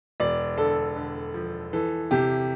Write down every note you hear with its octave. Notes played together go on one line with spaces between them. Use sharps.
E1 D5
D3 A4
D3
F3
E3 A4
C3 G4